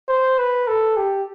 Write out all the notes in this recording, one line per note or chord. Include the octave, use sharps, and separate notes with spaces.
C5
B4
A4
G4